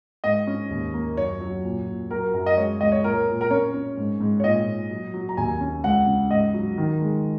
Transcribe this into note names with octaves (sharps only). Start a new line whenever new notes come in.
G#2 D#5
C#4
D#2
A#3
F#2 C#5
F#3
A#2
A#2
F#3 A#4
F#2 A#4
D#5
G#3 C#5
C#2 D#5
C#5
A#2 A#4
A#2
A#4
C#4 C#5
C#4
G#2
G#2
C#5
A#2 D#5
A#2
F#3
F#3
A#5
D#2 G#5
C#4
C#2 F#5
C#3
G#2 D#5
F#3
D#3
G#3